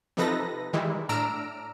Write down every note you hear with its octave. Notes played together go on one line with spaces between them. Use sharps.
C3 F3 D#4 A4 B4 A#6
D#3 E3 G3 G#3 E4
A2 D4 A#5 E6 F6 D7